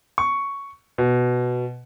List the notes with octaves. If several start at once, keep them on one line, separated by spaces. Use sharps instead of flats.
C#6
B2